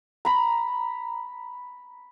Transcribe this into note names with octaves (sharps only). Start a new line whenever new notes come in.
A#5 B5